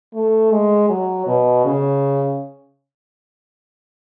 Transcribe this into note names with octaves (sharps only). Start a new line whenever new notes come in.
A3
G#3
F#3
B2
C#3